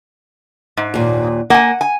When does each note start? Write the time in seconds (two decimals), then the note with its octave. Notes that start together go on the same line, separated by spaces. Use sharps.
0.77 G#2
0.94 D#2 A#2
1.50 A#3 F#5 G#5
1.81 G#5